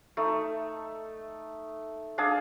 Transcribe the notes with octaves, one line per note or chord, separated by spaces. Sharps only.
A3 D#4
D4 G#4 F5 A5